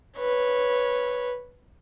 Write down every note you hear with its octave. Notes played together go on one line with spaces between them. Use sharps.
B4 C#5